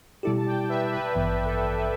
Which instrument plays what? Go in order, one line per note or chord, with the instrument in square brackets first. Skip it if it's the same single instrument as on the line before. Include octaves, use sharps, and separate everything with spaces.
[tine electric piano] B2 G3 E4 G4 [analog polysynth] A4 D5
[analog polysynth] A5
D5 G5
B4 E5
B4
[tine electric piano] A1 G2 E3 B3
[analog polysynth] A4
B4